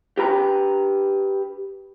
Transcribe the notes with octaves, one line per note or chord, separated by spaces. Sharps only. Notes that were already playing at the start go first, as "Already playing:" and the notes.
G4 B4 A#5